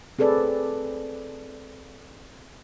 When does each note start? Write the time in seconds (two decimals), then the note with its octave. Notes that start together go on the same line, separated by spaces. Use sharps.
0.19 C4 G#4 A4 B4 D5